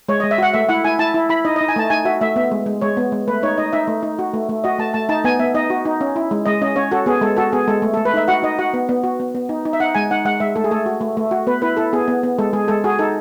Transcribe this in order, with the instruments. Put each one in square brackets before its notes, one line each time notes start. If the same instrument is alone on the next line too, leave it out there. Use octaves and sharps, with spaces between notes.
[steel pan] G#3 C#5
G#3 D#5
E5
F#4 F#5
A3 E5
E4 F#5
E4 G#5
E4 A5
E4
E4 B5
D#4 D#5
D#4 D#5
G#5
A3 A5
D#4 G#5
F#4 E5
A3 E5
B3 E5
G#3
G#3
G#3 C#5
B3
G#3
A3 B4
D#4 C#5
D#4 D#5
D#4 E5
A3
D#4
F#4
A3
A3
F#4 D#5
A3 A5
A3 A5
D#4 A5
B3 G#5
B3 E5
D#4 D#5
F#4
D#4
C#4
E4
G#3
G#3 D#5
C#4 D#5
C#4 C#5
F#4 A4
B3 G#4
G#3 A4
F#4 A4
B3 G#4
G#3 A4
A3
A3 A4
B4
D#4 E5
F#4 F#5
D#4 D#5
F#4 F#5
B3
B3
F#4
B3
B3
D#4
D#4
E5
D#4 F#5
G#3 G#5
D#4 F#5
G#3 F#5
G#3 E5
A3 A4
G#4
A3 A4
F#4
A3
A3
F#4
B3 B4
E4 B4
E4 A4
B3 G#4
B3
B3
G#3 A4
G#3 G#4
G#3 A4
F#4 G#4
D#4 A4